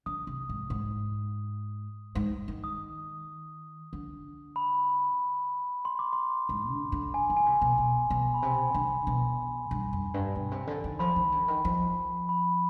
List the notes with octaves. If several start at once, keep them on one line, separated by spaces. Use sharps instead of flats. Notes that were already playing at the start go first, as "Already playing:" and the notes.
D3 D#6
C3
G#2
G#2
G#2
D#3
D#6
D3
B5
C6
D6
C6
G#2
D3
D3
G#5
D#3
G#5
C3
B2
B2
B2
B5
C3 G#5
D3
B2
G2
F2
G2
B2
C3
D3
D#3
F3 B5
D#3
D3
D#3
F3
B5